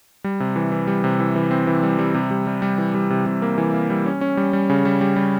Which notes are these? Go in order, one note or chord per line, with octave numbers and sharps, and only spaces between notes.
G3
C3
E3
E3
G3
C3
E3
E3
C4
E3
G3
G3
C3
G3
G3
G3
E3
G3
C3
C3
A#3
E3
A#3
G3
C#4
C#4
G3
G3
C#3
G3
G3
G3